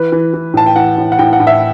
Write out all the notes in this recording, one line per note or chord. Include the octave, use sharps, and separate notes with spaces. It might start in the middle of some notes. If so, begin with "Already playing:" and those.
Already playing: E3 B4
E3
E3
A2 A5
G5
E3 F#5
A2
F#5
A2 G5
F#5
A2
E5